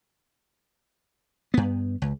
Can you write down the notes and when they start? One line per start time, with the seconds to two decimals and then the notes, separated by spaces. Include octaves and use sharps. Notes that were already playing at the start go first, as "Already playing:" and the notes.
1.54 G2 B3
2.02 C#2